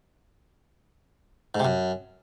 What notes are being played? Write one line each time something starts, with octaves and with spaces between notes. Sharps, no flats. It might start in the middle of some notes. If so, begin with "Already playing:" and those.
G#2
C3
F#2